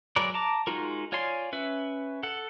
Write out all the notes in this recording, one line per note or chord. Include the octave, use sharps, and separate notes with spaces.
F#3 G#3 A#4 B4 D5
A5 A#5 D6
G#3 D#4 F4 F#4 A#4
F4 C#5 D5 G#5 C6
C#4 B4 E5
A4 F#5